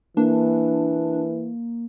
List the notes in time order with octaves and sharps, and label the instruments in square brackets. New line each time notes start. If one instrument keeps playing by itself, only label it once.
[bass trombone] E3 [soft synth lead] A#3 [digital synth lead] D4